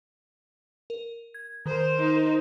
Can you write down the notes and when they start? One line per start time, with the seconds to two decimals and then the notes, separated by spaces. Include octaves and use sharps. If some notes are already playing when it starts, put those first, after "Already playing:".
0.90 A#4
1.34 G#6
1.66 D#3 A#4 C5
1.99 D#4